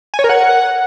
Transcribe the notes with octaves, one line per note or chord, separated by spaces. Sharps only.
G#5
C#5
A#4
F#5